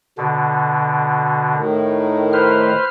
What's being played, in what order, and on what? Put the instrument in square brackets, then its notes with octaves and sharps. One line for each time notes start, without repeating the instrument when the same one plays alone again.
[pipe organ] B2 D3
[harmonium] A2 D#3
[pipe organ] B4 C5 F6